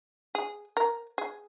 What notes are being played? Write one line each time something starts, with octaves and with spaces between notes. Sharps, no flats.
G#4
A#4
G#4